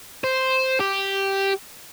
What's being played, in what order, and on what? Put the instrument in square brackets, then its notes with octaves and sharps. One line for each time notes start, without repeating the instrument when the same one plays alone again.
[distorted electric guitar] C5
G4